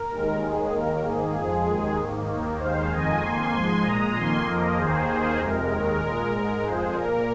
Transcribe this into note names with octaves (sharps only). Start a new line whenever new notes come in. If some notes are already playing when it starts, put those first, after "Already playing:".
Already playing: A#4
D#2 D#3 G#3
D#2 D#3 G#3 G#4
D#2 D#3 A#3 A#4
G#2 D#3 A#3 G#4
F2 F3 G#3 G#4
D#2 D#3 G#3
G#2 D#3 A#3
D#2 D#3 A#3
D#2 D#3 G#3 C5 F5
F2 D#3 G#3 D#5 G#5
F2 D#3 A#3 G#5 C6
G#2 F3 G#3
A#2 G#3 A#5 D#6
F2 D#3 A#3 G#5 C6
F2 F3 A#3 A#4 D#5
D#2 D#3 A#3 G#4 C5
D#2 D#3 A#3
F2 C3 G#3 A#4
D#2 D#3 G#3
A#2 G#3 A#4
G#2 G#3 A#4
F2 F3 G#3 G#4 C5
A#2 A#3 A#4